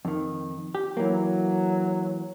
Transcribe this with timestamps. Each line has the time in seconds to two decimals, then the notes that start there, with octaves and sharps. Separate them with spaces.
0.05 F2 D#3
0.75 G4
0.97 E3 F#3 A#3